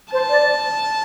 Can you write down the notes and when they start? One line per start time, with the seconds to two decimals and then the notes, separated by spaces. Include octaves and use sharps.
0.12 C5 A5
0.30 D5